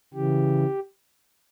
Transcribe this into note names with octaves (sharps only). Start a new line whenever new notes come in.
C#3 E3 G4